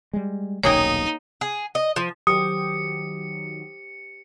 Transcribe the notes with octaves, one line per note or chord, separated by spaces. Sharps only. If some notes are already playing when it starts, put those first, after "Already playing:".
G3 G#3
D#1 B1 A#3 D#4 G#4 C#5 G5
G#4
D#5
F3
D#3 F#3 G4 C5 D#6 C#7